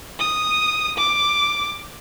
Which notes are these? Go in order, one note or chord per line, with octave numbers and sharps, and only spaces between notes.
D#6
D6